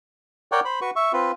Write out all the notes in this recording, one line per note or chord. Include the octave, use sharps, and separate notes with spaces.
A#4 C#5 D5 F#5 G5
C5 B5
F#4 B4 C#6
E5 C#6
C4 F4 B4